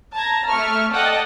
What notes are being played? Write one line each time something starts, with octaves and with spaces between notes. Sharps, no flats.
A5 A#5 G#6 A#6
A3 E5 C#6 F6
A4 D5 D#5 F#5 G5 A5